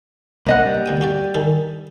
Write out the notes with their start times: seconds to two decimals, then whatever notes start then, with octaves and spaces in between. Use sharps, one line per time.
0.47 C2 A#3 D4 C5 D#5 F#5
0.66 G3
0.86 D2 G5 D#6
1.01 F#4 G4 D5
1.34 D#3 G#4 A4